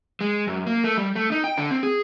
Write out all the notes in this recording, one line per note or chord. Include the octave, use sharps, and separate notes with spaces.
G#3
F#2
A#3
A3
G3
A3
D#4
G5
D3
C4
G#4